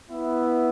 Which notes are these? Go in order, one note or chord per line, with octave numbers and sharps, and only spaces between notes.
B3 E4 B4 E5